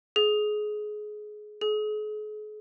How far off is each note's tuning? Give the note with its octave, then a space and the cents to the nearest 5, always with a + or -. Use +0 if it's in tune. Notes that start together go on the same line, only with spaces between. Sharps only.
G#4 +25
G#4 +45